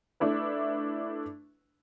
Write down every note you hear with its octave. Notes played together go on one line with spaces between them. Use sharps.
A3 D4 E4 B4